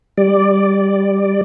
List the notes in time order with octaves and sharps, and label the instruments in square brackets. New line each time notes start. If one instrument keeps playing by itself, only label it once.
[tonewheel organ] G3 D5